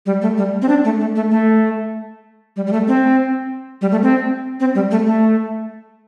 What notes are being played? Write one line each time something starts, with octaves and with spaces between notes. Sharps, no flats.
G3
A3
G3
C4
D4
A3
A3
A3
A3
G3
G3
A3
C4
G3
A3
C4
C4
G3
A3
A3